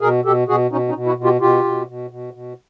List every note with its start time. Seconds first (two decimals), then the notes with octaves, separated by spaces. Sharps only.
0.01 B2 G#4 A#4
0.25 B2 G4 A4
0.48 B2 F#4 G#4
0.71 B2 C#4 D#4
0.89 C#4 D#4
0.95 B2
1.06 E4 F#4
1.18 B2
1.24 F4 G4
1.41 B2 F4 G4
1.64 B2
1.88 B2
2.10 B2
2.34 B2